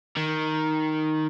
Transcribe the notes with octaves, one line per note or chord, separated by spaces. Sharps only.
D#3